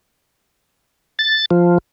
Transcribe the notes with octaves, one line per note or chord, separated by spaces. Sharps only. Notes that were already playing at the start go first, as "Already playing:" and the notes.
A6
F3